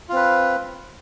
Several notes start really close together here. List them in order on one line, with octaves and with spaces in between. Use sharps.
F4 C4 B4